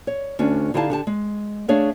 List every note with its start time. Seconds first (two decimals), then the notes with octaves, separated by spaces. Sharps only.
0.07 C#5
0.39 D2 C#4 D4
0.74 D3 D#4 E4 G4 F5 A5
0.90 D3 G4 A5
1.07 G#3
1.68 A3 D4 G#4 C#5 E5 F5